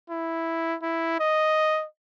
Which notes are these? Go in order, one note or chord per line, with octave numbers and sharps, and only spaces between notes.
E4
E4
D#5